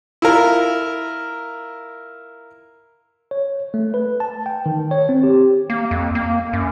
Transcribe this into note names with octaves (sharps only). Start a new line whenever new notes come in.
E4 F4 A#4
C#5
A3
B4
A5
G5
D#3
C#5
C4
G4
A#3
F2
A#3
F#2